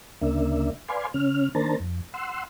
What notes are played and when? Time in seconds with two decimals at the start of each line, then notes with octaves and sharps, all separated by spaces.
0.21 D2 C#3 A#3 D4 E5
0.88 B4 D5 F5 G#5 C6
1.14 C#3 C#4 F6
1.55 D#3 A#3 D4 C5 A5 A#5
1.80 F2
2.14 F#5 C6 E6